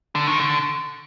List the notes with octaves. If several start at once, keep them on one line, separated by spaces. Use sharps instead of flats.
D3
D#3
D3